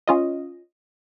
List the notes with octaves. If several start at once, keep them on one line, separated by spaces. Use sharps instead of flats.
C#4 F4 D#5